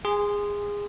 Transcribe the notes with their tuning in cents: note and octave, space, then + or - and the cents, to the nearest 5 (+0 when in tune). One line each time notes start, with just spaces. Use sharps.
G#4 -20 G#5 +0 C6 -15